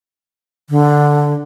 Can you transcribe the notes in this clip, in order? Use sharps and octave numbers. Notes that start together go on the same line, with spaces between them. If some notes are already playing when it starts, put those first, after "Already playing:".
D3